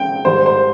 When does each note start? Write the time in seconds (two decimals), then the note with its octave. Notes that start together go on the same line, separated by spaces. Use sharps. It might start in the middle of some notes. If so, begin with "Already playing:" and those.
Already playing: C#2 C#3 G#3 C4 G5
0.25 G#2 D#3 G3 C5
0.46 C5